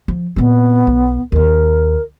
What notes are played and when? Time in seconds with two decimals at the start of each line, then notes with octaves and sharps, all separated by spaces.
0.08 F3
0.36 A#2 B3 C4
0.87 B1
1.32 D#2 D#3 A#4